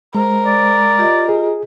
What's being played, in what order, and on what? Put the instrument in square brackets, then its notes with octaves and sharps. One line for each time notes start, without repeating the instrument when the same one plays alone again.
[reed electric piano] G#3 [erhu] A#4 [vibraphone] C5
[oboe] D5
[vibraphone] F4 G4 D#5
[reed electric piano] G#4